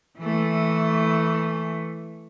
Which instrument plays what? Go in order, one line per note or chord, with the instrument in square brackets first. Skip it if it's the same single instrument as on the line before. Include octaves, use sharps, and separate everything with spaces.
[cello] E3 A3